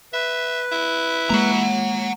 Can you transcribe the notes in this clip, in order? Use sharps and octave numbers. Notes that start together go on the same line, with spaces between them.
B4 E5
E4
G#3 A#3 F#5 A#5